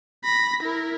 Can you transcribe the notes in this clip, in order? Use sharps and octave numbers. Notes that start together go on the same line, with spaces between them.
B5 A#6
E4 A#4